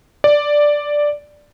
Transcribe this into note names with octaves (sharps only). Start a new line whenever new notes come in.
D5